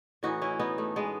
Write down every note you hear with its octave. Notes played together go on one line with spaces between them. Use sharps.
A2 E3 D#4 F#4
C#4 E4
B3 D#4
A3
G#3 B3